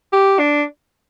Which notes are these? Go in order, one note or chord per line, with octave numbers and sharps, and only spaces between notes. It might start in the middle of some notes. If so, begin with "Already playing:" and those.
G4
D4